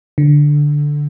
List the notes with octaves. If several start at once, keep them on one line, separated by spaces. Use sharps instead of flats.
D3